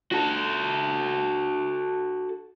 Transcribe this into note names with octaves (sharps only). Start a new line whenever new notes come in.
F#4 A4